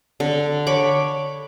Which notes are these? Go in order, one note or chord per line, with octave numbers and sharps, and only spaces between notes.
D3
C#5 B5 D6